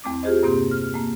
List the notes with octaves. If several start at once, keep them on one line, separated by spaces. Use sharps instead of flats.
E2 A3 C4 D6
F4 G4 G#4 C5 D#5
G2 C3 A#3 C4 G4
F6
A3 A#3